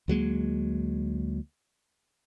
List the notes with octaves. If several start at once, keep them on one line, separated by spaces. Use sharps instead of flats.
D2 F#3 G#3 A#3